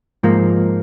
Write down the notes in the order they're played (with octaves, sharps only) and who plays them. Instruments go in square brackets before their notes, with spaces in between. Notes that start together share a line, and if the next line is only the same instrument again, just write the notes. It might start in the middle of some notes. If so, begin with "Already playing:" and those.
[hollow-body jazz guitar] G#2 F3 A#3